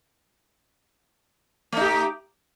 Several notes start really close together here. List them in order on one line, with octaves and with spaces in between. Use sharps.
A3 D#4 G4